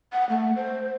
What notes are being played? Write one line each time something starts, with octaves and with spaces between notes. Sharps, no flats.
F#5
A3
C5